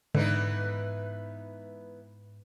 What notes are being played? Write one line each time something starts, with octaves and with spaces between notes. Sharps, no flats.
G#2 D3 E3 B3 D#4